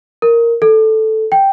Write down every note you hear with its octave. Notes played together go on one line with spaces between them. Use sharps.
A#4
A4
G5